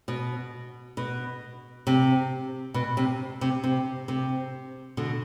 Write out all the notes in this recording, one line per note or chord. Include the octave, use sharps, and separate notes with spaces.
B2
B2
C3
B2
C3
C3
C3
C3
B2 D3